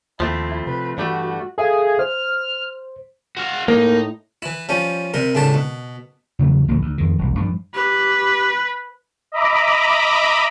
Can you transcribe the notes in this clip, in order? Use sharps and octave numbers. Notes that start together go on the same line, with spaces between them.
D#2 F3 A3 C4 E4
C3 B4
G2 E3 G3 A3 F#4
G#4 A4 E5 F5
C5 F6
F#4 F5
A2 A#3 D#4
E3 E4
F3 G3 C#4
C3 G3 A#4
C#2 A2 G3 D4 A5
B2
E2 C#3 F#3 A3
D2 A2 F3 A#3
D2
F2 D#3
E1 C2
G2 F3
G4 B4
D#5 E5 A#5 B5 D6